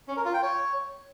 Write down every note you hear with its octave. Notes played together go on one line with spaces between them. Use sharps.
C#4
A#4
F4
G5
C#5